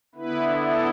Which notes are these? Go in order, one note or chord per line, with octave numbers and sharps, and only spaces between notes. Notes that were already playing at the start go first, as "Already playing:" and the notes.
D3 B3 E4 B4
A4